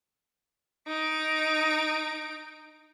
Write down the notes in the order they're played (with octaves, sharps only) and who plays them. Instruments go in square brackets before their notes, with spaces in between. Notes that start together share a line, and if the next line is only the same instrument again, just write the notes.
[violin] D#4 D7